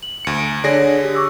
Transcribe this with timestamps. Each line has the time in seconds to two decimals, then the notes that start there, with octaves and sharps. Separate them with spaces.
0.03 F#7
0.25 D2 C#7
0.38 D7
0.64 D3 D4 G#4 C#5 D5 A#6
1.04 G4
1.15 C#6 D6 E6